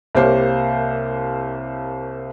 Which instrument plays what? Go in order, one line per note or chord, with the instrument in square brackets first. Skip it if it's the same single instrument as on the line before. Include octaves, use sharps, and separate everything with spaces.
[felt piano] C2 A#3 G4 C5 C#5 F5